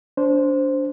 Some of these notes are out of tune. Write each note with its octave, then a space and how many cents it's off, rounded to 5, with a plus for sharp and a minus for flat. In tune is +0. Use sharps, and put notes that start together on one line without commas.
D4 -25 C5 +0